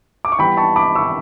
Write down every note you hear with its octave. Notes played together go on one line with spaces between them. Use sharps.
D6
C#6
E3 G3 B3 G5 B5
A5 C#6
B5 D6
C#6 E6